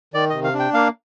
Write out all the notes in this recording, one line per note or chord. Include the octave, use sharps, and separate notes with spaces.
D#3 D5
C3 D#5
F5
D4
G5
A#3 F5